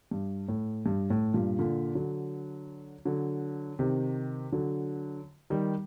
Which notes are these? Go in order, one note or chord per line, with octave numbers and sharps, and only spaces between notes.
G2
A2
G2
A2
G2 A#2
A#2 D3
D3 F#3
D3 F#3
C3 D#3
D3 F#3
D#3 G3